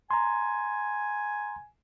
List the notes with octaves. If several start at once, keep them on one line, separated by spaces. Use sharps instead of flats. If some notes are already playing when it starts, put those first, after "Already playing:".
G#5 A#5 C6